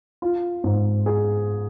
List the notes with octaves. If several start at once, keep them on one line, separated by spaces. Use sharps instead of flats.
F4
G#2
G#4